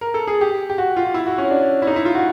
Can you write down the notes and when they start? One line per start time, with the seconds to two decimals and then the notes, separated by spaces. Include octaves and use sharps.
0.01 A#4
0.14 A4
0.27 G#4
0.41 G4
0.70 G4
0.78 F#4
0.97 F4
1.14 E4
1.27 F#4
1.38 C#4
1.51 D4
1.82 E4
1.87 D#4
1.96 E4
2.05 F4
2.15 F#4